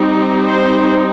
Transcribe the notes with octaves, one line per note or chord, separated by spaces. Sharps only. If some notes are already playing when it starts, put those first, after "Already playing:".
Already playing: G3 C4 D#4
C5